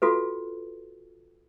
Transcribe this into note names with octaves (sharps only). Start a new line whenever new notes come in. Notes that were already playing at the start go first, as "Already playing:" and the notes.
F4 F#4 A4 B4